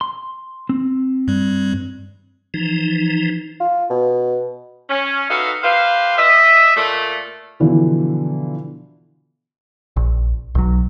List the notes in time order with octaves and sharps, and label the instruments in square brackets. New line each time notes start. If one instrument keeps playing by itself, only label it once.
[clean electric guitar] C6
C4
[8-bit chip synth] G2 G3
[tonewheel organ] E3 F3 D#4
[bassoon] F4
B2
[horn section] C#4
D#4 F#4 A4 B4 E5 F5
G4 B4 C5 F5
D#5 E5
A#2 A3
[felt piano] B2 D3 E3 F3
[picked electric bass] A#1
B1 F#3